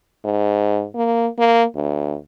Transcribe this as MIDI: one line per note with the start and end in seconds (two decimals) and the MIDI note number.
0.25 0.84 44
0.95 1.27 58
1.39 1.64 58
1.76 2.16 38